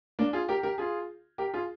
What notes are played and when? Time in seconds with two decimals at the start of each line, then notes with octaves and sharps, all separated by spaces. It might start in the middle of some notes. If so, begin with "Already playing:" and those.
0.19 A#3 D4
0.33 F4 G#4
0.49 G4 A#4
0.63 G4 A#4
0.78 F4 G#4
1.38 G4 A#4
1.54 F4 G#4